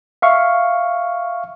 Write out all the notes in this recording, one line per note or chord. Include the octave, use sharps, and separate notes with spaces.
E5 F5 C#6